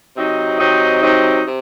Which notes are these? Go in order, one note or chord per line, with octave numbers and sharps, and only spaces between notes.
C3 F#3 C4 D#4
C3 F#3 C4 D#4
C3 F#3 C4 D#4
C3